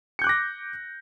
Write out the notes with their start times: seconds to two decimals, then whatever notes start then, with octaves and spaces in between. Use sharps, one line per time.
0.19 C#7
0.22 G6
0.24 F#6
0.27 D6
0.29 A#6